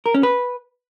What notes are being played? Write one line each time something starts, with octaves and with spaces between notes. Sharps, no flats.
A#4
C#4
B4